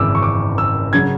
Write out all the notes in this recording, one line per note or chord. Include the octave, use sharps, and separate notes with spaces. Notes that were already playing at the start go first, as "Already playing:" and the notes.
Already playing: G#1 F#2 C#3 E3 D6 E6
C#6
D6
E6
C#3 F#3 G#6